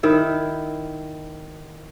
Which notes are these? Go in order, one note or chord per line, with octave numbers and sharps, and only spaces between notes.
D#3 E4 E5